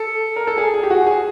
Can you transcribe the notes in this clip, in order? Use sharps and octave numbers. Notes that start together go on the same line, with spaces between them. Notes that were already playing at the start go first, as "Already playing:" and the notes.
Already playing: A4
A#4
A4
G#4
G#4
G4
F#4
G#4